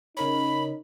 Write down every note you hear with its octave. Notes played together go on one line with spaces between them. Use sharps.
C#3 D#4 A#4 C#5 B5